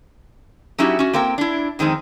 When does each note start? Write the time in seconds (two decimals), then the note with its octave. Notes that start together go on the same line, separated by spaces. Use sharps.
0.78 F#3 C#4 D#4 E4 F#4 G4
0.99 C#4 F#4
1.13 A#3 C4 A#4 G5
1.38 D4 E4
1.79 F2 D#3 G#3 C4 D#4